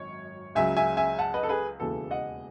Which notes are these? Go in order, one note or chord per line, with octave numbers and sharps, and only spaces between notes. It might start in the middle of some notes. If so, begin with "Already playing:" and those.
Already playing: G#1 F#2 D#3 C#5
C#2 C#3 F#3 E5 G#5
E5 G#5
E5 G#5
F#5 A5
B4 D#5
A4
G#4 B4
E1 D#2 C#3 E3 A4
D#5 F#5